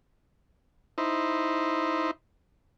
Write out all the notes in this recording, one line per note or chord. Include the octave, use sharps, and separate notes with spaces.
D#4 E4 C5